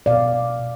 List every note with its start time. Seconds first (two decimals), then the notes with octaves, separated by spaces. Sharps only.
0.06 B2 D5 F5
0.33 B2
0.59 B2